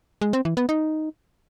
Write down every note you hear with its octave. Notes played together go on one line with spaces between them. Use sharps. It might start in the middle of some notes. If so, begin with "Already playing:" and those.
G#3
C4
E3
B3
D#4